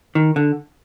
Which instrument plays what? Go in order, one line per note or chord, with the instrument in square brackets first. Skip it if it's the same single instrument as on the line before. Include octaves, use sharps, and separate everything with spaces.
[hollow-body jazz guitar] D#3
D3